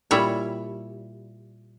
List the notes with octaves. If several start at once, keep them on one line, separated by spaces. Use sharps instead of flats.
A#2 G3 E4 C#5